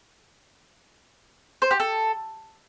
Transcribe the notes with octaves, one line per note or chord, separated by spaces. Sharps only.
C5
G4
A4